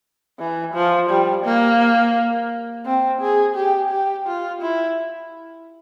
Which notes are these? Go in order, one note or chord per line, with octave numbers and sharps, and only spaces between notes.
E3
F3
G3
A#3
C4
G#4
G4
G4
F4
E4